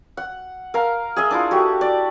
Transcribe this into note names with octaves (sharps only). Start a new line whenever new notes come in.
F#5
A#4 F5 A#5
G#4 D#5 E5
D4 E4 F4
F#4 G4 A4 E5
D5 E5